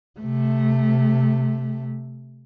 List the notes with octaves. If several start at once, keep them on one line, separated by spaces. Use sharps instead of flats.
C3 A3